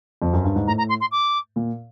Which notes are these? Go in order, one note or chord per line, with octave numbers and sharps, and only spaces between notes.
F2
F#2
G2
G#2
A2 A#5
A#5
C6
C6
D6
A#2